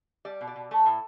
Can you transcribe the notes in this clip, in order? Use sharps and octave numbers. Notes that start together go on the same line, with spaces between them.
G3 D5
B2
D5
B2
A3 A4
A2